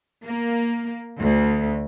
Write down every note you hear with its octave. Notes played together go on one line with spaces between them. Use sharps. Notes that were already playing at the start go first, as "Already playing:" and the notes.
A#3
D2